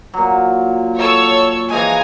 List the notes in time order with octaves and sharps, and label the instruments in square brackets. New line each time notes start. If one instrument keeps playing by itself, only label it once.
[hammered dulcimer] A#2 F#3
[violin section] A4 C#5 E6
[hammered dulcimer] E3 F3 G#3 [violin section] G#5 A#5